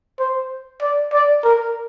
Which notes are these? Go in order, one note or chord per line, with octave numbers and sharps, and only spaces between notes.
C5
D5
D5
A#4